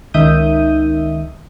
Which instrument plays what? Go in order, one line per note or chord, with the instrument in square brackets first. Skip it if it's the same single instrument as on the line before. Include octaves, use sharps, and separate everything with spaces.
[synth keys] C#2 D#3 E5 D#6 G6 D#7